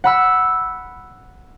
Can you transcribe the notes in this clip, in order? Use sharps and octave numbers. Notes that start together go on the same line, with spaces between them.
F#5 B5 E6